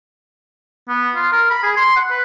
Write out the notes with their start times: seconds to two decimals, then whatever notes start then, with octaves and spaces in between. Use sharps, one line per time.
0.89 B3
1.15 F4
1.32 A#4
1.50 B5
1.63 G#4
1.77 C6
1.96 F#5
2.10 B4